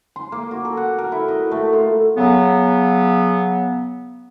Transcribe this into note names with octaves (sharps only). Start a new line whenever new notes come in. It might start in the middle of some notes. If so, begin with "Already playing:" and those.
C6
A#3
F#4
A4
F#5
A#4
E4
D#5
A3
F4
C#3 F#3 B3